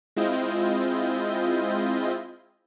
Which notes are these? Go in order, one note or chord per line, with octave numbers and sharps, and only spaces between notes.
G#3 C4 E4 F4 D#5 G6